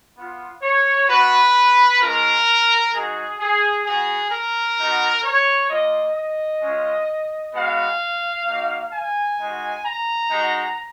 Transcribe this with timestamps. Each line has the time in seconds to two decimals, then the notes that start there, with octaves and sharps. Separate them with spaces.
0.17 B3 F4
0.62 C#5
1.09 B3 F#4 B4
2.01 G#3 C#4 F4 A#4
2.93 G#3 D#4 F#4 G#4
3.40 G#4
3.86 B3 F#4 G#4
4.31 A#4
4.78 B3 D#4 F#4
5.24 C#5
5.70 A#3 F4 D#5
6.16 D#5
6.62 G#3 C#4 F4
7.54 G#3 B3 F#4 F5
8.47 A#3 D#4 F#4
8.93 G#5
9.39 G#3 D#4 F#4
9.85 A#5
10.30 G#3 D#4 F#4